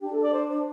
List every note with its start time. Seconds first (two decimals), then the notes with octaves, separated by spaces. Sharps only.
0.02 D4 G4
0.12 A4
0.23 D5
0.33 C5